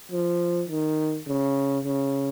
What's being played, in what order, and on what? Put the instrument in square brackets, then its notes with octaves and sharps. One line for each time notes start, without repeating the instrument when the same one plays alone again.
[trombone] F3
D#3
C#3
C#3